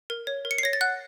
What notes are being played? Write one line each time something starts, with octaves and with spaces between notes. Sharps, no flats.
A#4
C#5
A#4
C#7
C7
C#5 A#6
A6
F#5 F#6